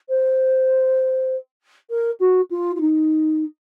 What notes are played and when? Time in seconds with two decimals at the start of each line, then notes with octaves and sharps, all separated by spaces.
0.09 C5
1.89 A#4
2.19 F#4
2.50 F4
2.75 F4
2.80 D#4